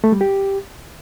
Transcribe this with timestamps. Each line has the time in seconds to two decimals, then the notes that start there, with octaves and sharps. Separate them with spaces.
0.04 A3
0.12 G3
0.21 G4